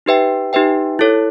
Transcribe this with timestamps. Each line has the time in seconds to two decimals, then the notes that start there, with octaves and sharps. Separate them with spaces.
0.06 D#4 G4 B4 E5 G5
0.53 D#4 G4 B4 E5 G5
0.99 E4 A4 C#5